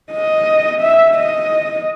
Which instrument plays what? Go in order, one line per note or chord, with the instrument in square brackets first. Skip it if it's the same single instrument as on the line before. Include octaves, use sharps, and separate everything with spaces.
[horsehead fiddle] D#5
E5
D#5